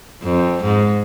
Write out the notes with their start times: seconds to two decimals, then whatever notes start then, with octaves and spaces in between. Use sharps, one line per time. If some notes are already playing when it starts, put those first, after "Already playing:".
0.23 F2
0.63 G#2